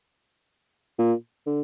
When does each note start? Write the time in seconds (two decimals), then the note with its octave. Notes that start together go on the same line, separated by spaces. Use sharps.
0.99 A#2
1.47 D3